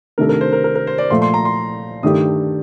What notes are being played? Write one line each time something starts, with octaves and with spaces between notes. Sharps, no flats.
C3 D#3 A3 D4 A4 A#4
A#4
C5
A#4
A#4
A#4
C5
D5
A#2 F3 A3 C6
C6
A#5
C6
G2 D#3 A3 D4 G4 D#6